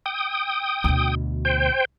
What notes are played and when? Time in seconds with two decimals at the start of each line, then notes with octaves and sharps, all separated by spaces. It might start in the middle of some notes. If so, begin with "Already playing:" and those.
0.06 G5 D#6
0.84 D2 B2
1.45 C5 G5